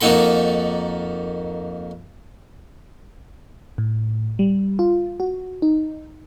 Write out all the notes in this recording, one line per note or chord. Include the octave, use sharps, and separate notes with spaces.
F2 A#3 D#4 F#4 A4 B5
A2
G3
F4
F#4
D#4